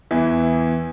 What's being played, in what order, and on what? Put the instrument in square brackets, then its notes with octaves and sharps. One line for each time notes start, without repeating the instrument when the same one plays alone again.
[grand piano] E2 E3